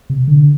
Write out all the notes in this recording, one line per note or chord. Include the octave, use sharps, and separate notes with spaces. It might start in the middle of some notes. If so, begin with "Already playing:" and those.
C3
D3